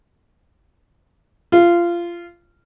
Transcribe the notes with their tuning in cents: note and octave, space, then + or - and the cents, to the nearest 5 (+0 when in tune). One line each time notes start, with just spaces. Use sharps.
F4 -20